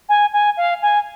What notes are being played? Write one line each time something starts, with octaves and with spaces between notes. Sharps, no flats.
G#5
G#5
F5
G#5